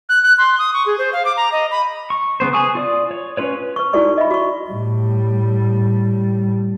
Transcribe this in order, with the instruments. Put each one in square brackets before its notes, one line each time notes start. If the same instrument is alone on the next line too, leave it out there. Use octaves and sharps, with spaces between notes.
[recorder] F#6
F#6
C6
D#6
C#6
G#4
C5
F5
D6
A#5
D#5
B5
[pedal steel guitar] C#6
C#3 B3 C5
G#4 G#5 C#6 D#6
F4 D5 D#6
C#5
C#4 F4 B4 C#5
[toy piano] B4 C#6
D#4 E4 F#4 A4 D5 C#6
D#5 E5 B5
F#4 C#6
[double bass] A2 G3